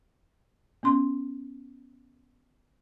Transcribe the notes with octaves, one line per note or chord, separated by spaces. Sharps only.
B3 C#4 C6